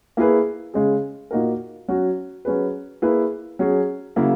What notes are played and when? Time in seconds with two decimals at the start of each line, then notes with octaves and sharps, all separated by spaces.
0.17 A#3 E4 G#4 B4
0.74 C#3 G#3 C#4 G#4
1.31 A#2 A#3 D#4 F#4 A#4
1.88 F#3 C#4 F#4
2.45 F#3 C#4 G#4 B4
3.02 A#3 E4 G#4 B4
3.59 F#3 C#4 G#4
4.16 C#3 F#3 A#3 E4